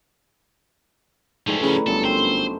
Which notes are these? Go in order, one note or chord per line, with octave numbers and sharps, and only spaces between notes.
G#2 E3 F3 G3 A3 C#4
C#3 D#4 B4
G1 F#2 C#3 A4
C4 C5